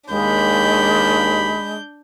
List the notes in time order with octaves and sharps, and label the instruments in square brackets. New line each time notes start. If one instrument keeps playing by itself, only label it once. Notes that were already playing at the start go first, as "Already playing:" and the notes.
[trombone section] D#2 [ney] G#3 [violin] D4 G6 [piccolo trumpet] B5